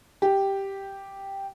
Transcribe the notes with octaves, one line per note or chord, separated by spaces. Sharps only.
G4